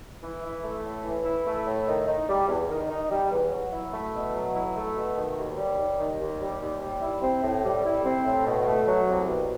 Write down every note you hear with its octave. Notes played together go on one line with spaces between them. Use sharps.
E3
E4
A3
A2
E3
E4
A3
A2
D#3
D#4
G3
E2
D#3
D#4
G3
E2
F#3
E4
A3
B2
F#3
E4
A3
B2
D#3
D#2
G3
D#2
D#3
D#2
G3
D#2
G3
E4
C4
A2
G3
E4
C4
A2
B2
A3
F#3
C2
B2